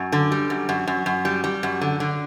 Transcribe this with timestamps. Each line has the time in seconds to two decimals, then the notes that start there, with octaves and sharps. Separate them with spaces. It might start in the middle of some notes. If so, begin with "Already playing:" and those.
Already playing: F#2
0.12 D3
0.32 G3
0.50 F#2
0.69 F#2
0.88 F#2
1.06 F#2
1.25 G3
1.44 G3
1.63 F#2
1.81 D3
2.00 D3